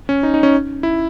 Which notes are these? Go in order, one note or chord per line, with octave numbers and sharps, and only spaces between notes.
C#4
D#4
D#4
C#4
E4